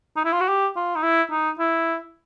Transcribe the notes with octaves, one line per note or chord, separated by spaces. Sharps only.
D#4
E4
F4
F#4
G4
F4
D#4
E4
D#4
E4